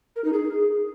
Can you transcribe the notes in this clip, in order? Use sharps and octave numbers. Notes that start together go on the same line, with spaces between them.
A#4
D#4
G#4